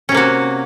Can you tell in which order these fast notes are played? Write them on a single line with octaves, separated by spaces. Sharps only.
C#4 C3 A#3 F#4